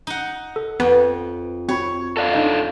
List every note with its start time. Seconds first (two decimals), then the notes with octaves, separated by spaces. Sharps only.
0.07 D#4 F#5
0.56 A4
0.80 F2 B3
1.69 C4 F#4 C#5 B5
2.17 A4 D5 F5
2.34 D4 D#4 D#5